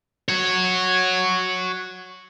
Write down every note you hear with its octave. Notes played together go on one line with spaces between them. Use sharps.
F#4 C#5